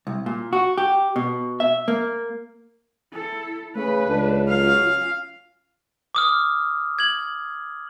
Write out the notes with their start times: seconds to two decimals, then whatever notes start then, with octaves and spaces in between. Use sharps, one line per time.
0.07 C2
0.26 A#2
0.53 F#4
0.78 G4
1.16 B2
1.60 E5
1.88 A#3
3.13 E4 A4
3.76 C#3 A3 B4
4.07 C#2 D4 A4
4.48 F#3 C#4 F4 F5
6.15 D6 D#6 F6
6.99 G#6 F#7